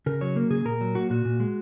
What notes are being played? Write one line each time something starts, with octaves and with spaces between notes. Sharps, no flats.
C#3 A#4
F#3 C#5
A#3 A#4
C#3 G#4
A#2 A#4
F#3
A#3 F#4
A#2 F#4
A#2
G#3